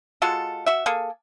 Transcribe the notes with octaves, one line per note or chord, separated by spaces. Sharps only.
G#3 F4 F#4 A4
F#4 E5
A#3 G#4 A4